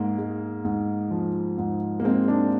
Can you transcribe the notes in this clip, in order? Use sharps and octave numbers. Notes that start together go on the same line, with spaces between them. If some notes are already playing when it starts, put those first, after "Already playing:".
Already playing: G#2 G#3 A#3
G#3
G#2
F3
G#2
A#3
G#3 C4
D4